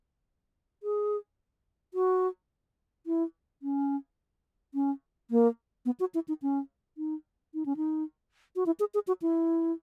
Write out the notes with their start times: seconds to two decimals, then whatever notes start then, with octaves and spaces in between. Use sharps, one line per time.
0.83 G#4
1.94 F#4
3.06 E4
3.62 C#4
4.74 C#4
5.31 A#3
5.85 B3
6.00 F#4
6.14 E4
6.28 D#4
6.42 C#4
6.98 D#4
7.54 D#4
7.66 C#4
7.77 D#4
8.56 F#4
8.66 E4
8.80 G#4
8.94 G#4
9.07 F#4
9.22 E4